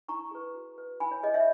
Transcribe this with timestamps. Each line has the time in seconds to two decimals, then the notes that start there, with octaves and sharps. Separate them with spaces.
0.09 E4 A#5 C#6
0.31 G#4 B4
0.55 F#4
0.78 B4
1.00 E4 G#5 B5
1.11 C#5
1.23 G#4 C#5 D#5
1.34 C#5 E5